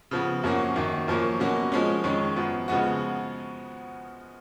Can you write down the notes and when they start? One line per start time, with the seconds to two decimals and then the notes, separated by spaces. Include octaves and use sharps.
0.11 C#3 F3 B3
0.43 F#2 F3 A#3 C#4 F#4
0.76 F#2 D#3 A#3
1.08 F#2 F3 A#3 C#4
1.40 B2 F#3 A#3 C#4 F#4
1.72 F3 G#3 C#4
2.04 F2 D#3 G#3 C#4
2.36 F#2 F3 B3
2.68 C#3 F3 G#3 B3 F#4